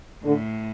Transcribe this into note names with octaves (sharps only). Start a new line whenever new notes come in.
A2 D3